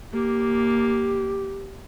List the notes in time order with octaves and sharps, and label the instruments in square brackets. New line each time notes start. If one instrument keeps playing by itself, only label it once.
[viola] A#3 [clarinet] G4